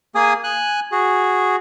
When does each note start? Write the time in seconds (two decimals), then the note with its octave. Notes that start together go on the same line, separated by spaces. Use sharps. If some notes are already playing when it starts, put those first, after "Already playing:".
0.15 A#3 G#4 G#5 D#6
0.44 G#5 F#6
0.92 F#4 G#4